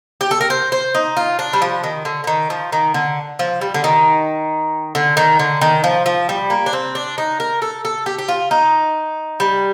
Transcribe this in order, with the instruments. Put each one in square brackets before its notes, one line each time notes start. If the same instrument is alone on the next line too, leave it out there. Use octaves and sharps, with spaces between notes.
[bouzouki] G4
A4
A#4
C5
C5
D#4
F4
D4
G3
F3
D#3
D3
D3
D#3
F3
D#3
D3
F3
G3
D3
D#3
D3
D#3
D3
D#3
F3
F3
G3
A#3
D4
C4
D4
D#4
A#4
A4
A4
G4
G4
F4
D#4
G3